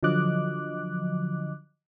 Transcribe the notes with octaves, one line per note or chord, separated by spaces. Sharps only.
D3 F3 F#3 D#5 D6 F#6